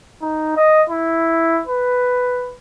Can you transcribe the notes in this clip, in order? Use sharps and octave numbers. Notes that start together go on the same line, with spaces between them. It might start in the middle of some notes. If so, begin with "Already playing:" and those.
D#4
D#5
E4
B4